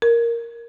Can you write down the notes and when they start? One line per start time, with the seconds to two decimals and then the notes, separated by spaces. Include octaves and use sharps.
0.02 A#4